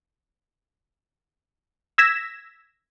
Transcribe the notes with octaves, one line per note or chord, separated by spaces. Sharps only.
E6 G#6 A#6 B6 E7